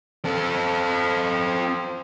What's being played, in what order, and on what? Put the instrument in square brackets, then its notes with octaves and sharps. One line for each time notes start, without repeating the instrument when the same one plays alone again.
[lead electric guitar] C4 A4